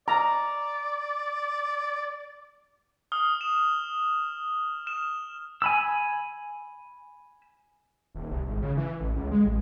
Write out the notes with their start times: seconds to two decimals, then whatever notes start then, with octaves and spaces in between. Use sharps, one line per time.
0.08 D5 A#5
3.12 D#6 F6 G7
3.41 E7
4.87 F6 E7
5.62 G#5 B5 E6
8.14 D#1
8.31 C2
8.47 G#1
8.62 C#3
8.77 E3
9.00 A1
9.16 C#2
9.31 G#3
9.44 A1